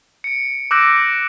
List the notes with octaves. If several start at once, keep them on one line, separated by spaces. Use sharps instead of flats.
C#7 D7
D6 E6 F#6 G6 A#6 D7